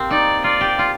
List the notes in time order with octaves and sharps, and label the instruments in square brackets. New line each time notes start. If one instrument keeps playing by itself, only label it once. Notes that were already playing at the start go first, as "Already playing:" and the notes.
Already playing: [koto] A#3 C4 G4
[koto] D#4 [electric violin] D5
[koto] F4 [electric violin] D5
[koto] G4
F4